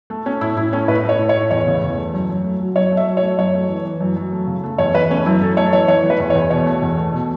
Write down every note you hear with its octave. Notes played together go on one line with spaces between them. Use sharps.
A3
A3 C#4
A2 E4
A2 E4
A3 C#4
A2 B4
A3 C#5
A2
C#5
A2
E2 C#5
C#3
E2
A3
F#2
F#2
A3
F#3
F#2 C#5
A3
E5
F#3
C#5
A3
F#2 C#5
A3
E3
E3
F#2
F#2
A3
C#3
A3
E2 C#5
E2 B4
A3 C#4
F#2 E4
F#2 A4
A3 C#5
E3 C#5
E3 C#5
E3
B4
E2
C#5
E2
B2 C#5
A3
E2
A3
B2